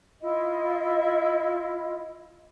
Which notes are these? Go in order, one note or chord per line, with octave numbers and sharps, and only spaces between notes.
E4 F4 D#5